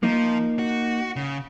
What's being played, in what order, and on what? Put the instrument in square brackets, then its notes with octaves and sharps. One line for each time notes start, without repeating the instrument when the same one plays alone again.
[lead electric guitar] F3 [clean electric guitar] A#3 D#4 A#4
[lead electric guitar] F#4
C#3